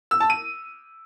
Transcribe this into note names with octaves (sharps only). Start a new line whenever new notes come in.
E6
A5
D#7